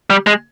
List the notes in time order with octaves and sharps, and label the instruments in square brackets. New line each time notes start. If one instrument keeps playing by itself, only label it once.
[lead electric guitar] G3
G#3